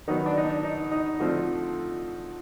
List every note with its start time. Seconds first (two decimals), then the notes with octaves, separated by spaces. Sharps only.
0.08 D#3 F#3 B3 D#4
0.26 D4
0.37 D#4
0.45 D4
0.64 D#4
0.91 D#4
1.19 D3 F3 A3 C4